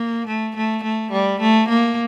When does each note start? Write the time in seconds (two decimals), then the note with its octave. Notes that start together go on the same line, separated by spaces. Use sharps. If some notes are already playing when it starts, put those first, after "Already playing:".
Already playing: A#3
0.28 A3
0.56 A3
0.84 A3
1.12 G3
1.41 A3
1.68 A#3